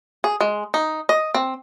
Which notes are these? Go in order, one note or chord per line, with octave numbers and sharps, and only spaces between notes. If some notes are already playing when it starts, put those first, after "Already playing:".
G#4
G#3
D#4
D#5
C4